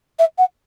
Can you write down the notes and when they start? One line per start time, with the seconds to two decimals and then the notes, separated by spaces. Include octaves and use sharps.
0.19 E5
0.38 F#5